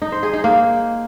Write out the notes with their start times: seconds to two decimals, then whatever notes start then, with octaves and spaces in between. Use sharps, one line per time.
0.02 D#4
0.12 C5
0.23 G#4
0.33 D#4
0.44 A#3